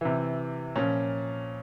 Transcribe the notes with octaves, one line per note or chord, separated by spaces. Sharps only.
C3 E3
A#2 F3 C#4